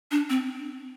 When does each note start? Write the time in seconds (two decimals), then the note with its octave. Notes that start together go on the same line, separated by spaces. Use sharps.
0.11 D4
0.30 C4